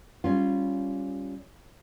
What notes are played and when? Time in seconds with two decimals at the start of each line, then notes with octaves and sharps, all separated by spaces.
0.24 G3 C#4 F4